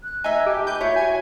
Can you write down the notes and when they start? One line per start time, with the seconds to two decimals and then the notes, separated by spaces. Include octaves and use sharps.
0.04 F#6
0.24 D#4 E5 G#5
0.46 G4 A5
0.67 B4 G6
0.81 E4 F#4 C#5
0.96 G#5